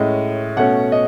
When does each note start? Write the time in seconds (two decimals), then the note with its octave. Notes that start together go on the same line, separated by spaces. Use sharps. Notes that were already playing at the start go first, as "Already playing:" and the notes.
Already playing: A2 G#3 C#4 D#5
0.57 B2 A3 C#4 F#5
0.92 D#5